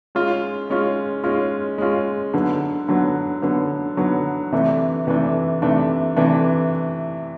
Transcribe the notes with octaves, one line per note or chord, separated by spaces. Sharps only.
G#3 C#4 F4
G#3 C#4 F4
G#3 C#4 F4
G#3 C#4 F4
D3 F#3 B3
D3 F#3 B3
D3 F#3 B3
D3 F#3 B3
C3 E3 A3 D4
C3 E3 A3 D4
C3 E3 A3 D4
C3 E3 A3 D4